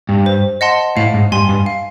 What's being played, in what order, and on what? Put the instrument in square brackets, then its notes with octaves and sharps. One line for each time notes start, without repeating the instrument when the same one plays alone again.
[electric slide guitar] G2
[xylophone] C5
D#5 F#5 A5 C6
[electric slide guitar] A2 [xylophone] F5
[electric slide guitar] G#2
[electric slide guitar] G2 [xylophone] G#5 C6
[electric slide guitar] G2
[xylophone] F5